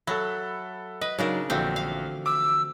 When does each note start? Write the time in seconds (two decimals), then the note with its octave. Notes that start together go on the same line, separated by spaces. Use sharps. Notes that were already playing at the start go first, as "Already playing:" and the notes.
0.07 F#3 A4 E5 F#5 B5 F#6
1.01 B4 D#5
1.18 C#3 F#3 D4 D#4 A#4
1.50 A#1 D3 E3 F3 A3 C4 F#4
1.76 F5
2.26 D6 E6